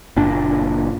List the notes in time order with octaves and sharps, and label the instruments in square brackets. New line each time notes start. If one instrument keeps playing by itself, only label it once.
[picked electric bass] F#1 A#2 D4